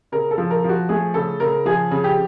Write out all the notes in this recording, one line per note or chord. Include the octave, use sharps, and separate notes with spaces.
C#3 A#4
A4
F3
A#4
F3
F#4
A3 G#4
C#3 A4
C#3 A#4
F3 G#4
C#3
G4